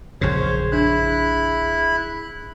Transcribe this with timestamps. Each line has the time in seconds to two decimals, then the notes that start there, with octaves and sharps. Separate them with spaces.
0.21 A#1 F#2 C#3 G#4 C5 C#5
0.72 D4 E4 B5 F#6